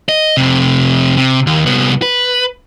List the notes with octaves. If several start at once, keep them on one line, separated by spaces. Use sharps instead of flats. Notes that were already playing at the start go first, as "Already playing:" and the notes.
D#5
F2 C3
C3
D#2
C2 B3
B4